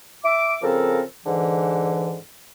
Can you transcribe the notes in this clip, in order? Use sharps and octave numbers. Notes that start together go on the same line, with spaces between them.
E5 D6
C#3 F3 C4 A4 A#4
G#2 D3 E3